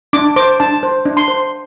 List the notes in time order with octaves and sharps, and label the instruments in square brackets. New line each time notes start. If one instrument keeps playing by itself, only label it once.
[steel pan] D4 D6
C5 D6
D4 A5
C5
D4
C6
C5